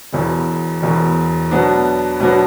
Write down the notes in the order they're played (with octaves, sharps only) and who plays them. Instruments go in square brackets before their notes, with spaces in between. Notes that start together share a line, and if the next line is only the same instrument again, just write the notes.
[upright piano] E1 E2 B2
E1 E2 B2
B2 F#3 B3 D4
B2 F#3 B3 D4